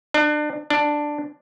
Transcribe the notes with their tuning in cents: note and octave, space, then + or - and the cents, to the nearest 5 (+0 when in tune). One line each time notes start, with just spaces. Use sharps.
D4 +30
D4 +5